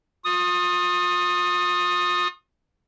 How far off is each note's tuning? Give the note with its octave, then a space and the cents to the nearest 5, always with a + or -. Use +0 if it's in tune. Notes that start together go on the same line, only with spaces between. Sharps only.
F4 +40 D#6 +0